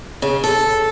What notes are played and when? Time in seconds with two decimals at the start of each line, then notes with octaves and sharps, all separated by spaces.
0.22 C#3
0.44 A4